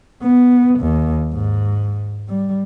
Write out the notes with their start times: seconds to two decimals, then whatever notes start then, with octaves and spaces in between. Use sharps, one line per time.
0.22 B3
0.79 D#2
1.32 G#2
2.29 G3